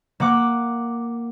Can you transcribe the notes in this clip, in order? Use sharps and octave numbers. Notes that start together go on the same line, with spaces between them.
A#3 F#5 D6